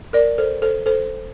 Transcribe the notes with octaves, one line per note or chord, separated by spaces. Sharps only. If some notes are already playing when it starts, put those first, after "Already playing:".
A#4 D5
A4 C5
A4 C5
A4 C5